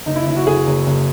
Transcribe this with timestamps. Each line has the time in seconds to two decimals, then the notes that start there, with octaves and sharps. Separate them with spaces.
0.06 F#1 D#4
0.16 E4
0.26 F#1 E4
0.37 F#4
0.46 F#1 G#4
0.67 F#1
0.86 F#1